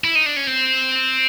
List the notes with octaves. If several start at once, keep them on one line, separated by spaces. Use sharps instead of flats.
E4
D#4
D4
C#4
C4